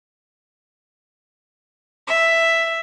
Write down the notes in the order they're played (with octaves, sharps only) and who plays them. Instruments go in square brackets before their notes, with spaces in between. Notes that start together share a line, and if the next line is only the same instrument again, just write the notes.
[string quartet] E5